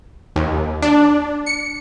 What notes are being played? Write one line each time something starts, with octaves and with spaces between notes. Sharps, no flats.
D#2
D4
C#7